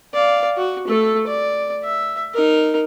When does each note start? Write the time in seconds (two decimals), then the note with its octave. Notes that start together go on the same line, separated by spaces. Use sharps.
0.14 D5 F5
0.57 F#4
0.87 A3 A4
1.27 D5
1.84 E5
2.35 D#4 A#4